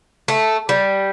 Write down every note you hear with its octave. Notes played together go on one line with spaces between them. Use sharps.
A3
G3